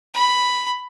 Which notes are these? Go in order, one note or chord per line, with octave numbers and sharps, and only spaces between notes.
B5